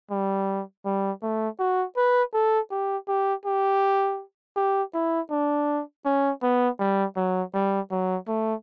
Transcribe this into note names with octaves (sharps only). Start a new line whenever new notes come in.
G3
G3
A3
F#4
B4
A4
G4
G4
G4
G4
E4
D4
C#4
B3
G3
F#3
G3
F#3
A3